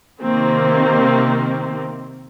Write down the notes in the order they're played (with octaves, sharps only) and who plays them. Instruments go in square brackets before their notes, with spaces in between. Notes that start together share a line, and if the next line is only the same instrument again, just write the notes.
[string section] C3 D#3 A#3 C4